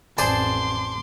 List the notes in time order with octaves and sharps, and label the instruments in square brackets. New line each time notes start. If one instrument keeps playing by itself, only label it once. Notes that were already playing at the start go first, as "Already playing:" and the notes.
[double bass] A1 F2 [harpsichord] G#4 C5 D5 [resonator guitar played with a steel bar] A5 [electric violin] C6 D6